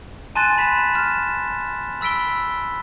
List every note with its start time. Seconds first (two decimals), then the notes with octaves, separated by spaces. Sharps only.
0.35 G#5 A5 C6 F#6 A6 D#7
0.58 B5 B6 E7
0.95 F6 E7
2.01 B5 E6 B6 D7 G7